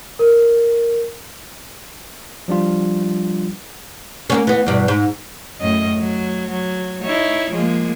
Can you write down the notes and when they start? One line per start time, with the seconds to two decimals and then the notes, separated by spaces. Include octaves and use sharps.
0.19 A#4
2.48 F3 G3 D4 F4
4.30 A#3 B3 C#4
4.47 E3 B3
4.67 E2 G2 B2
4.88 G#2
5.61 F#2 A2 D#5
5.98 F#3
6.51 F#3
7.02 D#4 E4 C#5
7.51 F3 G#3 A#3